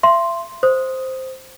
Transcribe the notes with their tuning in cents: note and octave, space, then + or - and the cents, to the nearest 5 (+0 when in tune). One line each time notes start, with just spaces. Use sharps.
E5 +40 C6 +0
C5 +0 D#6 +0